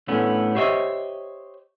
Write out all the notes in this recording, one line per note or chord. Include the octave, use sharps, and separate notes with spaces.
A2 A3 B3 C#4 D4
G4 C5 C#5 D#5 E5